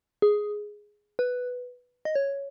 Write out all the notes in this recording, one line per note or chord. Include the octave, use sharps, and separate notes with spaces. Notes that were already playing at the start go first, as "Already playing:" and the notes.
G#4
B4
D#5
C#5